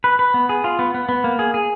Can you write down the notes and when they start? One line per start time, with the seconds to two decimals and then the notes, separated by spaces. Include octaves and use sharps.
0.04 B4
0.19 B4
0.34 B3
0.49 G#4
0.64 F4
0.79 B3
0.94 B3
1.09 B3
1.24 A#3
1.39 G#4
1.54 G#4